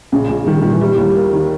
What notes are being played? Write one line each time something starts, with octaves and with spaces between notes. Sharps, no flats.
A#1 C#3
A#1
D#3 G3
A#2 D#3
E3
G3 E4
D#2
A#3
D#3